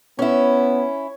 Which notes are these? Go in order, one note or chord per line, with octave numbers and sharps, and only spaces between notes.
B3 C#4 E4 C#5